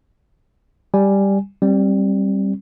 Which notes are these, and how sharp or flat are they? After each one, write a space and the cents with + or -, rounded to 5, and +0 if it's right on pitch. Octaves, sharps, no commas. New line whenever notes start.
G3 +5 G#5 +0
G3 +0 C4 +35